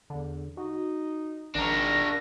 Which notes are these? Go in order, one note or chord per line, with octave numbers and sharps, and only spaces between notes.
E2 D3
D#4 F#4
G#1 D#3 D4 A#4 A#6